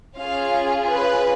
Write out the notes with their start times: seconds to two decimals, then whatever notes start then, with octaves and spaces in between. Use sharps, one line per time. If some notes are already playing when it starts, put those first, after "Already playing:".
0.18 C#4 F4 G#4 F5
0.90 B4